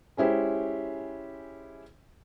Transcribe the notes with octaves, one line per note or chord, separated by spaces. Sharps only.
G#3 C#4 E4 G4 C5